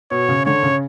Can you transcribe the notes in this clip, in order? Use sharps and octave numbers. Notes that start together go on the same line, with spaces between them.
B2 C#5
C#3
D3 C#5
C#3